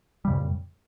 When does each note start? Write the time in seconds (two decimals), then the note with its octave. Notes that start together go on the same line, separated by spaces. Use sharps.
0.25 G3
0.27 C#3
0.30 F2
0.33 A#2